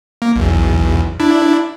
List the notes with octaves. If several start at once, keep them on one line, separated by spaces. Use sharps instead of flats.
A#3
B1 E2
D4 E4